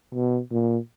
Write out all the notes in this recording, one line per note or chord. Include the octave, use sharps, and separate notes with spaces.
B2
A#2